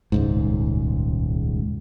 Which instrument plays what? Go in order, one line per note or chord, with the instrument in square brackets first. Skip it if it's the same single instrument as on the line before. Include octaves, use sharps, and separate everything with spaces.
[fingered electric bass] D#1 C#2 G#2